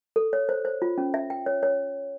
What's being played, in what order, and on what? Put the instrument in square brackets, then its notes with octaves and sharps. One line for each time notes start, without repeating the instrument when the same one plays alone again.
[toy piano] A4
C#5
C5
C5
F4
C#4
E5
G5
C#5
C#5